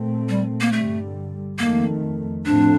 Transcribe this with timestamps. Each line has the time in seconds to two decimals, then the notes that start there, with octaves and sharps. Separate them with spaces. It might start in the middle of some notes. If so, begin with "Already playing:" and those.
Already playing: A#2 A3 C4
0.29 G3
0.60 A#3
0.72 G2 D3 G3 A3
1.58 F2 D#3 A3 A#3
2.45 A2 F3 A3 C4 D4